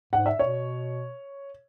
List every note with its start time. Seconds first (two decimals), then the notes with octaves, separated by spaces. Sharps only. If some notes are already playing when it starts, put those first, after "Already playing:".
0.13 G#2 F#5
0.26 E5
0.39 B2 C#5